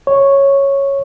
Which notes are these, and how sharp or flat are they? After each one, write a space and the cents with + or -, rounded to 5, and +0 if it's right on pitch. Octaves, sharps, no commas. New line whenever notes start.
C#5 -5